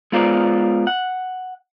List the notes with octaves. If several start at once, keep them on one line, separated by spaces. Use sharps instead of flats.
G#3 B3 F4 A#4 C5 D5
F#5